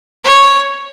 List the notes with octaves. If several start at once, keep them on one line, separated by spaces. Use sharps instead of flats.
C#5